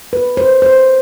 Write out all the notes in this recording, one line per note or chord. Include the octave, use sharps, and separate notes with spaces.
B4
C5
C5